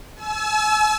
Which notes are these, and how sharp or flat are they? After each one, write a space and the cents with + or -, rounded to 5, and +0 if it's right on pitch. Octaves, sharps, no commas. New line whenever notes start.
G#5 +45 E6 +0